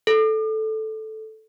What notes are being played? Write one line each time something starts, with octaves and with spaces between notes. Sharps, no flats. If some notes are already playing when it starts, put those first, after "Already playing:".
A4